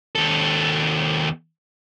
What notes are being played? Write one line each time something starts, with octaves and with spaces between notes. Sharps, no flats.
D#2 A4